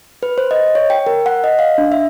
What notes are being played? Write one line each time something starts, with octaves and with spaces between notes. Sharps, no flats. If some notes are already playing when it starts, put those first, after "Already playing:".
B4
C5
D#5
C#5
G5
A#4
F#5
D#5
F5
D4
E5